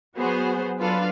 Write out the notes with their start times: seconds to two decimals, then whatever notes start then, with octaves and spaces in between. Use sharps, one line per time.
0.15 F#3 B3 F#4 G#4 C5
0.79 F#3 D4 F4 A4 B4 F5